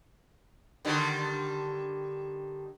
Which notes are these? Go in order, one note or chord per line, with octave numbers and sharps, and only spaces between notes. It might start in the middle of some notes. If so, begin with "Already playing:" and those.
D3 D#3 G3